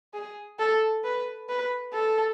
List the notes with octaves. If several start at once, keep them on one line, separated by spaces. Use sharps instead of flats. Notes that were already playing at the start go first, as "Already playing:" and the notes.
G#4
A4
B4
B4
A4